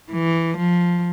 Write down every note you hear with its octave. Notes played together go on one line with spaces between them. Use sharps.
E3
F3